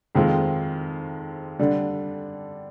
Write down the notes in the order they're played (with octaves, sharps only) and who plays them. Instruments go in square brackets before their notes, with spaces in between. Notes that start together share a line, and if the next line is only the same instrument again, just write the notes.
[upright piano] F2 D#3 G#3 C4 F4
D3 G3 D4